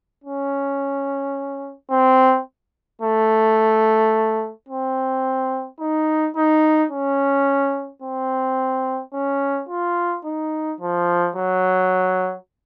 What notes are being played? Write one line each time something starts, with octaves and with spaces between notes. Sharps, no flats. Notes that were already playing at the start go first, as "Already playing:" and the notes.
C#4
C4
A3
C4
D#4
D#4
C#4
C4
C#4
F4
D#4
F3
F#3